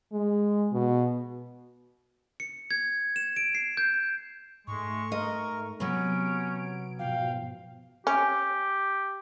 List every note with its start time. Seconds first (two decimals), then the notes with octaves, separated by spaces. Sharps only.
0.12 G#3
0.73 B2
2.40 C#7
2.71 G#6
3.16 E7
3.36 D7
3.55 C7
3.77 G6
4.67 G#2 G#3 A3 C#6
5.12 A#4 D#5
5.80 C3 F#3 B3 C#4 C#5 D7
6.99 G#2 B2 F3 F5 G5
8.07 C#4 G4